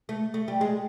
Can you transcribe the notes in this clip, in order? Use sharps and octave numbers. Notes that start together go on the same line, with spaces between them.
A3
A3
G3
G#3